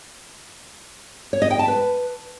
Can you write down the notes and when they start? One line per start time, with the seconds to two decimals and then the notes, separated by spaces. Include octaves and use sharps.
1.33 C#5
1.42 D#5
1.50 G5
1.59 A5
1.68 B4